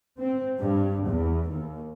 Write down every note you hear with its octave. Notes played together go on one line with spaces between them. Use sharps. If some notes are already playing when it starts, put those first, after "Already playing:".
C4
G2
E2
D#2